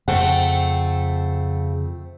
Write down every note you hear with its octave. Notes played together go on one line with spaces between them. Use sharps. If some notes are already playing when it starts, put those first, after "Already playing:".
F2 C#3 A3 C4 F#5